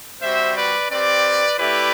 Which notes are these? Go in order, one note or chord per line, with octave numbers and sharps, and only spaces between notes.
G3 C4 F#4 C5 E5
B4 D5
C4 G4 B4 D5
A3 E4 G4 B4 D5